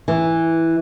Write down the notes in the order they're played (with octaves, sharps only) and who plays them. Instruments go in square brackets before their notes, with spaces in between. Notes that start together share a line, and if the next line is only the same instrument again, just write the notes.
[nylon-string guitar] E3